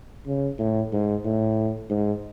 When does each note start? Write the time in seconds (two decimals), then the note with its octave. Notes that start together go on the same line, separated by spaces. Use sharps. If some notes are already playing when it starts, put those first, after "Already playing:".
0.27 C#3
0.58 A2
0.92 G#2
1.24 A2
1.89 G#2